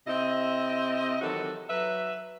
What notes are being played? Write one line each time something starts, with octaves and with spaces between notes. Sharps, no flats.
C3 C4 E4 D#5
D#3 E3 F#3 F#4 G4 A4
F#3 B4 E5